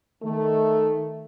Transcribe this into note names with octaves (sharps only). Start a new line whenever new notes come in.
D#3 A3